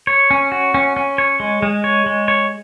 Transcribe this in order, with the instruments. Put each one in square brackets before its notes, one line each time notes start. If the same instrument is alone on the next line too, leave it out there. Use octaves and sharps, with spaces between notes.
[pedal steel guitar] C#5
C#4
F#4
C#4
C#4
C#5
G#3
G#3
C#5
G#3
C#5